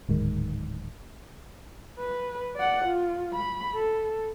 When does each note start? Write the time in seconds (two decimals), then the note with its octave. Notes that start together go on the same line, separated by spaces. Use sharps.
0.09 D1 G#2 D#3
1.99 B4
2.56 D5 F#5
2.85 F4
3.34 B5
3.75 A4